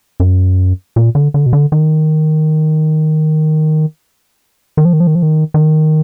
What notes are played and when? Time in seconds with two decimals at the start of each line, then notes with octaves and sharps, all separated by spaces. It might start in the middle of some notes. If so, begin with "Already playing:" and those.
0.20 F#2
0.96 A#2
1.15 D3
1.34 D3
1.46 B2
1.53 D3
1.72 D#3
4.77 D#3
4.85 F3
4.93 D#3
5.00 F3
5.07 D#3
5.15 F3
5.22 D#3
5.54 D#3